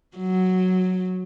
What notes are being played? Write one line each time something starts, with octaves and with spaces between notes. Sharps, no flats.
F#3